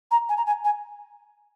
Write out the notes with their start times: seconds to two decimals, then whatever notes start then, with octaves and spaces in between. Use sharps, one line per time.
0.11 A#5
0.29 G#5
0.37 A#5
0.46 G#5
0.64 G#5